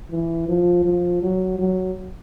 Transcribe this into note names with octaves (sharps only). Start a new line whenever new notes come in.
E3
F3
F3
F#3
F#3